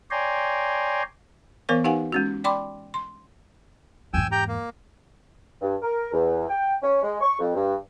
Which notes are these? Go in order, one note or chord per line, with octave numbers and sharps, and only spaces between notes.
C#5 D5 G5 G#5 A#5 C6
E3 B3 A#4 C5 F5 C#6
D#4 G4 B4 F5 F#5 G#5
G#3 C#4 F#4
D5 G5 B5 C6 D6
C6
E2 G#2 G5 G#5 E6
G4 G5 A#5
A#3
G2
A#4
E2
G5
C#4
G#3
C#6
F2
G2